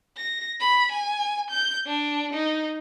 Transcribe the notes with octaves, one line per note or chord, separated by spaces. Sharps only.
A#6
B5
G#5
G6
D4
D#4